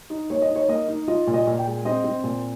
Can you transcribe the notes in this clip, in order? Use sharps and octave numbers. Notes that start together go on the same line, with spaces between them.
D#4
A#3 C#5
D#5
D#4
C#5
A#3 D#5
D#4
F4 D#5
A#2
D#5
A#2
G5
G#3
C4 D#5
C4
A#2